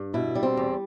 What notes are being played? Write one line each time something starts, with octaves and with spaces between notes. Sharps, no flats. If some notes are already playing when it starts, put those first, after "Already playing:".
Already playing: G2
B2 E4
G3
C4
E2